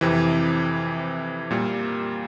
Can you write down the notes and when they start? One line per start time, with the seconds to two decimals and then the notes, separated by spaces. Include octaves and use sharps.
0.01 F2 C3 E3
1.51 A#2 G3 A#3